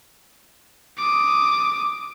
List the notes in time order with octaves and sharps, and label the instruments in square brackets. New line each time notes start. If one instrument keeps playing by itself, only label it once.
[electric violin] D6 D#6